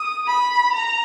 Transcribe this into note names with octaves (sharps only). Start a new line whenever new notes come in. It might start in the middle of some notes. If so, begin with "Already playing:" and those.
Already playing: D#6
B5
A#5